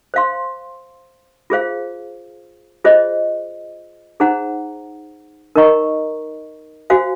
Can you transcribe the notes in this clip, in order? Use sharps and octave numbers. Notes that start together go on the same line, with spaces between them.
C5 F5 C6
F4 G#4 C5 F5
F4 G#4 C5 D#5
D#4 G#4 C5 F#5 A#5
D#4 A#4 D#5 A#5 C#6
F#4 C5 F5 G#5